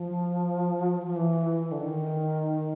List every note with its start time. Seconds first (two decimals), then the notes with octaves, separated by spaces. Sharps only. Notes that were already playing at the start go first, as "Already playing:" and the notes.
Already playing: F3
1.06 F3
1.16 E3
1.72 D3
1.80 D#3